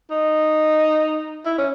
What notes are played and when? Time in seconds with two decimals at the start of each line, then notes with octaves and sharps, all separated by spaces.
0.11 D#4
1.46 E4
1.58 C#4